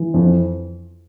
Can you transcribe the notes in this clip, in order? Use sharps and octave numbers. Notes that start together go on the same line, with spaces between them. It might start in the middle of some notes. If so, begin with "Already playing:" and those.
Already playing: E3
F2